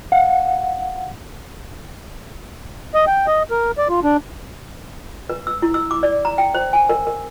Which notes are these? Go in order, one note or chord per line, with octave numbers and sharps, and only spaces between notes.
F5 F#5
D#5
G5
D#5
A#4
D5
F4
D4
B4
E6
E4
E6
D6
D5
A#5
G5
C5
G#5
A#4
A#4